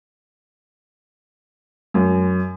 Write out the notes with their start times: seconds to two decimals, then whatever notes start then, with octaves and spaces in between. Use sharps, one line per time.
1.94 F#2